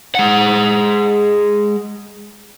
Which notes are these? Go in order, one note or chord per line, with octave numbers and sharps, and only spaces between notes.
G#3 F#5